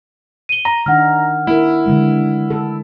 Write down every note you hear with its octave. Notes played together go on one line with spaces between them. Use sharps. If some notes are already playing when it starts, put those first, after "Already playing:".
D#7 G7
A#5
D#3 D4 D#4 F#5 F6
A#3 E4 A#4
D3 E3 G#3
A4